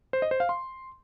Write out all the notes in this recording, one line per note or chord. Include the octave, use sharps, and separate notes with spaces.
C5
D#5
C5
F5
C6